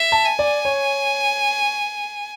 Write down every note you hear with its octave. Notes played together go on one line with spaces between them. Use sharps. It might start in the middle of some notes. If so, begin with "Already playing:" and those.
Already playing: E5
A5
G#5
D5
C#5